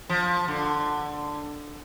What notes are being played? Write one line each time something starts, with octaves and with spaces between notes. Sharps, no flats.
F3
D3